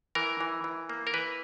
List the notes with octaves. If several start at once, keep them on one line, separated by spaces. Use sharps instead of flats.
E3 A#4
E3
E3
A#3
A#4
E3 B4